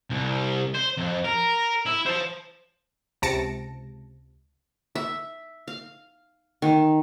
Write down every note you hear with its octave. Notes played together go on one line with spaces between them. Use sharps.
C2
C5
F2
A#4
E4
C5 A5
C#2 C3 A5 A#6 C#7 D7
E5
F5
D#3